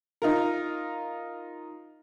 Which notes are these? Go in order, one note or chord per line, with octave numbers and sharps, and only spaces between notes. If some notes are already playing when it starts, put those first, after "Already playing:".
D#4 F4 A#4